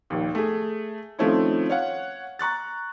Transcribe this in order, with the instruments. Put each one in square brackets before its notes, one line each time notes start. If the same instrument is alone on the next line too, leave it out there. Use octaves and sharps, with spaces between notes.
[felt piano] A#1 D#2
A3 G#4
D#3 F3 A3 C4 C#4 E4
C#5 F5 F#5
A#5 C#6 F#6 A6